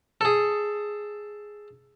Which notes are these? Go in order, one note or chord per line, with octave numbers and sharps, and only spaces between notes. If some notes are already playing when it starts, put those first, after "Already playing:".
G#4 A4